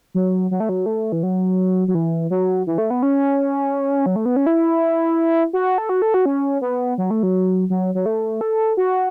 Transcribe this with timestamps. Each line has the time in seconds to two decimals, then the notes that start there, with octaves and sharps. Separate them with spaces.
0.15 F#3
0.51 F#3
0.60 A3
0.69 F#3
0.86 A3
1.12 E3
1.23 F#3
1.88 F#3
1.95 E3
2.30 F#3
2.67 E3
2.78 A3
2.90 B3
3.03 C#4
4.06 F#3
4.16 A3
4.26 B3
4.36 C#4
4.46 E4
5.53 F#4
5.78 A4
5.89 F#4
6.02 A4
6.14 F#4
6.26 C#4
6.61 B3
6.98 F#3
7.10 A3
7.23 F#3
7.70 F#3
7.95 F#3
8.06 A3
8.41 A4
8.77 F#4